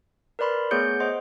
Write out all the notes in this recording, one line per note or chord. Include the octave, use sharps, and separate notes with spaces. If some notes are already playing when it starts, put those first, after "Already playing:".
A#4 B4 D5 B5 C6
A3 B3 G#4 C#5 G6 C#7
C5 D#5 F#5 C6